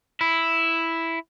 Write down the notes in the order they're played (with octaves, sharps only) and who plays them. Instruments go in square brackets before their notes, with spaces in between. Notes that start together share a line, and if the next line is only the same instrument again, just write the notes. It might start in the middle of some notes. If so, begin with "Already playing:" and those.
[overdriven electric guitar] E4